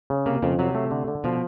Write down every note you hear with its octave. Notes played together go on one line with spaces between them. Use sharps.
C#3
C3 A#3
F2 C#3
C3 F#3
A3
D3
D3
B2 F3